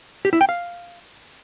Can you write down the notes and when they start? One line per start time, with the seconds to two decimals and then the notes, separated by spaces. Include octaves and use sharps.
0.25 G4
0.33 E4
0.41 G5
0.49 F5